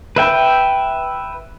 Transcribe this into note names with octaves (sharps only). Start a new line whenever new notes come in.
B4 E5 G5